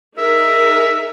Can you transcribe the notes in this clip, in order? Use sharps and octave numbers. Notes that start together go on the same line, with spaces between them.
D#4 G#4 A#4 E5